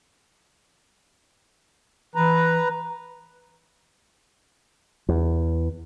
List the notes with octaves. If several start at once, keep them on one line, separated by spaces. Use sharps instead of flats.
E3 B4 A#5
E2